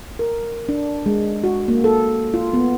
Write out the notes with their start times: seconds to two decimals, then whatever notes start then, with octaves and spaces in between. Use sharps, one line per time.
0.19 A#4
0.69 D4
1.06 G#3
1.44 F#4
1.68 A#3
1.84 A4
2.34 F4
2.54 B3